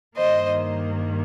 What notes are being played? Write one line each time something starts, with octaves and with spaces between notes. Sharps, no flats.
G2 D#3 A#3 C5 D#5